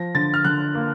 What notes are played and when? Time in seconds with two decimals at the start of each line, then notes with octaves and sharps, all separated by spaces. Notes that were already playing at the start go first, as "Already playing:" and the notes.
Already playing: F3 A#6
0.15 D3 A6
0.34 F6
0.44 D3 F#6
0.75 A#3